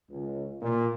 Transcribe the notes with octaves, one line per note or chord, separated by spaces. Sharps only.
C#2
A#2